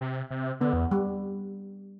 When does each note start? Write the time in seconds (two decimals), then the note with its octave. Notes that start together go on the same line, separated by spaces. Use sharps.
0.01 C3
0.30 C3
0.60 D3 B3
0.73 E2
0.91 G3